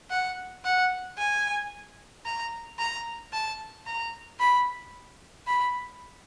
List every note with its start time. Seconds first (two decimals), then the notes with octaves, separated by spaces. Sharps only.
0.10 F#5
0.64 F#5
1.18 G#5
2.25 A#5
2.78 A#5
3.33 A5
3.86 A#5
4.40 B5
5.47 B5